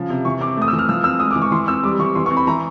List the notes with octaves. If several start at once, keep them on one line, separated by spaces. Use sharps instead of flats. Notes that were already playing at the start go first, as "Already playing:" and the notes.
Already playing: C#3 F3
C3
E3 C#6
C4 D6
A3 D#6
E6
E3
F6
F3 E6
C4 E6
G#3 D#6
D6
E3
C#6
E3 C6
C4 E6
G3 D6
E3 C#6
E3 C6
C#6
C4
B5
E3 A#5